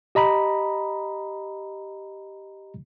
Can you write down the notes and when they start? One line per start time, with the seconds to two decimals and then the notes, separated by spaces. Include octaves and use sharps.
0.15 G4 D#5 A#5 B5